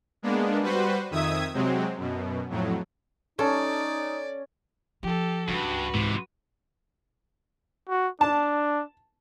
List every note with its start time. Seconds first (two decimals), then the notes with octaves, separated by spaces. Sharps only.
0.23 G#3 A#3 B3 D4
0.62 G3 F#4 B4 C5
1.11 F2 D#3 E5 D#6 G#6
1.54 C3 F#3 G#3 C4
1.97 F#2 B2
2.49 F2 A2 F#3
3.39 C#4 D#4 A4 D5
5.03 F3 G4 A4
5.49 C#2 G2 F#4 B4
5.94 G#2 C3 E3
7.89 F#4
8.21 D4 A5